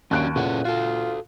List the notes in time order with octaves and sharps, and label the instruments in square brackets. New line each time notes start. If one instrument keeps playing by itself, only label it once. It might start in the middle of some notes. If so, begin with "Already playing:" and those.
[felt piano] D#2 F#6 D7 [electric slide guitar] C#4 D4 F#4
[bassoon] E2 [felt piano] A#2 [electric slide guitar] C#4 A4 F#5
[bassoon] F4 [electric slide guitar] F#4 A4